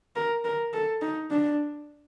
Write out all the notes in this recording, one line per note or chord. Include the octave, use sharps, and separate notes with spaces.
A#4
A#4
A4
D#4
D4